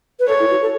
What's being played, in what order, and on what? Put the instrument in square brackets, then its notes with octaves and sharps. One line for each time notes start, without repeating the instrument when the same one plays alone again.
[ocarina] B4
[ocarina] A4 [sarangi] C#5
[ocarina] E4
F#4
A4